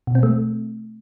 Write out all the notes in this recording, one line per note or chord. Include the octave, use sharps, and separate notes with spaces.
B2
C4
A3